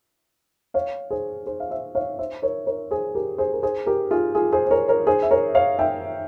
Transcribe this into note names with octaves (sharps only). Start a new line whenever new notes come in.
C#5 F5
G#4 C5
G#4 C5
F5
C5 E5
C#5 F5
C5 E5
A#4 C#5
A#4 C#5
G#4 C5
G4 A#4
G#4 C5
A#4
G#4 C5
G4 A#4
F4 G#4
F4 G#4
G#4 C5
C5
A#4 C#5
A#4 C#5
G#4 C5
E5
A#4 C#5
C#5 F5
E5 G5